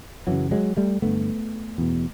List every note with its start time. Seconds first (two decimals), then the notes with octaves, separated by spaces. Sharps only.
0.27 F#2 C#3 E3 F#3
0.51 F#3 G#3
0.77 G3 A3
1.02 G2 D3 A3 B3
1.78 E2 B2